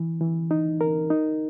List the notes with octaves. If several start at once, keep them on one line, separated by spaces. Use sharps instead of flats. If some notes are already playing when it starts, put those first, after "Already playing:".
Already playing: E3
E3
D#4
A#4
D#4